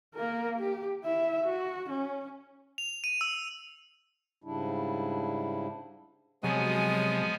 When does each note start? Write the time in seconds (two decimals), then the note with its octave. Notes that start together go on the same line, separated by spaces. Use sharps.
0.15 A#3 A#4
0.58 G4
1.04 E4 E5
1.45 F#4
1.90 C#4
2.78 F7
3.04 D#7
3.21 E6
4.44 G#2 C#3 G3 D4 E4
6.43 C3 F3 F#3 G#3 B3 G#5